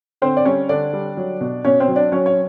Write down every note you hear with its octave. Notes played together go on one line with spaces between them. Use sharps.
D3 C4 C5
D5
G3 C#4 C#5
D3 D4 D5
G3
F#3
B2
B2 C#4 C#5
C4 C5
F#3
D4 D5
F#3 C#4 C#5
C#5